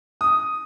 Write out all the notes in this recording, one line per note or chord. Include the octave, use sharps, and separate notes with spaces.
D#6